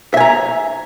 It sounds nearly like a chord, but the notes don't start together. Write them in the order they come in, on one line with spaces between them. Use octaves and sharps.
E5 G#5 A#5